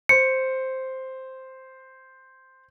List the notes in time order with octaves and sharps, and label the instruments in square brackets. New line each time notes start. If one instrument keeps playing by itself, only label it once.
[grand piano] C5 [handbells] C#7